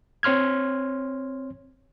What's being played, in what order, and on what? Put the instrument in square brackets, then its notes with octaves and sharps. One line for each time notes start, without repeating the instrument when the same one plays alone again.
[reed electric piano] C4 C#5 C6 F6 G#6